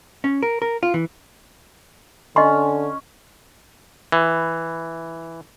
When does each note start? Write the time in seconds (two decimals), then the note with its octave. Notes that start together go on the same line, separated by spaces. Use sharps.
0.24 C#4
0.43 A#4
0.62 A#4
0.83 F4
0.94 E3
2.36 D3 C#4 D#5 C6
4.12 E3